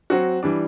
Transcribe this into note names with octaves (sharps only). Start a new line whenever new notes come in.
F#3 C4 F#4
E3 G3 D4